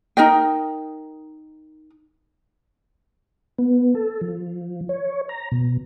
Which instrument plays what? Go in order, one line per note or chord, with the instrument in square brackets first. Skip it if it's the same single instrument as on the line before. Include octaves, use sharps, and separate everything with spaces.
[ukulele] D#4 A#4 D#5 G5
[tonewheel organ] B3
A4
F3
C#5
A#5
B2